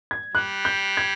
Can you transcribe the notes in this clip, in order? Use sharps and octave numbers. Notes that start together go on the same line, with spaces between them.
G#6
G3 F#6
G6
G#6